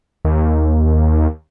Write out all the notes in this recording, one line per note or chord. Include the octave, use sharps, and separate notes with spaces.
D#2